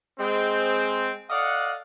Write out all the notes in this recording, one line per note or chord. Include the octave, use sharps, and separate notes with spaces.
G#3 C4
A4 D5 D#5 F5 F#5